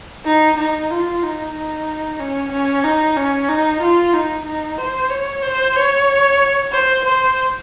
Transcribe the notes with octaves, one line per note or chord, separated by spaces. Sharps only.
D#4
D#4
F4
D#4
D#4
C#4
C#4
D#4
C#4
D#4
F4
D#4
D#4
C5
C#5
C5
C#5
C5
C5